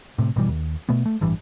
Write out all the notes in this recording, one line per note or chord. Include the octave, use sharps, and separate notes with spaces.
A2 C3
G#1 B2 E3 G3
D#2
B2 A3 B3
A3
A1 G2 E3